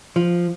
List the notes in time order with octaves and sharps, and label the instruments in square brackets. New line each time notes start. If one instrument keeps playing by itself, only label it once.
[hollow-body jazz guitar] F3